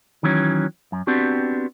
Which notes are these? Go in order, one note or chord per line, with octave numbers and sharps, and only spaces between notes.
D#3 E3 F#3 C#4
F#2
B3 C4 D4 F#4 G4